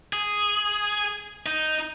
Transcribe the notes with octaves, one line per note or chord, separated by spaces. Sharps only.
G#4
D#4